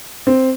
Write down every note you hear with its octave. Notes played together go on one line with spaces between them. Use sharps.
C4